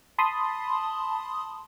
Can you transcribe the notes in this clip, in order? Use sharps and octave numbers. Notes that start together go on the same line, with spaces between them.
A5 B5 C6 D#6